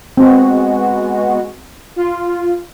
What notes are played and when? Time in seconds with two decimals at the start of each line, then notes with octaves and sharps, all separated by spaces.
0.17 G#3 B3 C4 F#4
1.96 F4